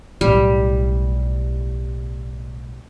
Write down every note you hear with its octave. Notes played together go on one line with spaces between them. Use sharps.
B1 A2 G3